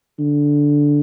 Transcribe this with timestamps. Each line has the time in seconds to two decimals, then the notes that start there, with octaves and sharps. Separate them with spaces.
0.19 D3